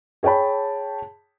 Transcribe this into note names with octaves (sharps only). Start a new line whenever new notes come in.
G#4 C#5 G5 A5 B5